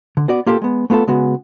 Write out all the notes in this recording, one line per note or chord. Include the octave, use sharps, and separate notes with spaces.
D3
B3 F#4 D5
A#3 F4 G4 A4
G#3 B3
A3 B3 F4 F#4 A4
C#3 G#3 B3 F#4